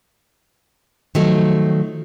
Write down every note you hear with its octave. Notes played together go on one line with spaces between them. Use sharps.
D#3 F3 F#3 A3